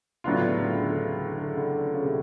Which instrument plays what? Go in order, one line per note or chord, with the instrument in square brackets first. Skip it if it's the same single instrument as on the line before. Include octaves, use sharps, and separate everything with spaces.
[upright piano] A2 F#3 B3 D4 F4 [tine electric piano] C#3
[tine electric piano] D3
C#3
D3
C#3
D3
C#3
D3
C#3
D3
C#3
C3